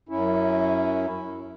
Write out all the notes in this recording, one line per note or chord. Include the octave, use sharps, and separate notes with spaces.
F#2 C#4 E4